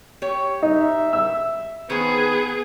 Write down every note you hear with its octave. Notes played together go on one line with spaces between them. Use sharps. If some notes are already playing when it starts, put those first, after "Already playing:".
G4 C#5
D#4 E5
E6
D#3 B3 G#4 B4 C5